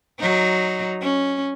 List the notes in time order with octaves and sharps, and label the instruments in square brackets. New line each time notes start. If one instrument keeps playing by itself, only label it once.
[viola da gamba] F#3 D#4
C#4